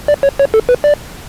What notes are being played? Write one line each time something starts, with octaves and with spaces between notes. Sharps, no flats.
D5
C#5
C#5
A4
B4
D5